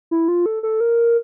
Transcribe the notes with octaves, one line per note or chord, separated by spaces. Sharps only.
E4
F4
A4
A4
A#4